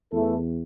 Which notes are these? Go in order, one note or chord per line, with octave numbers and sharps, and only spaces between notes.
E2 E3 A3 E4 A4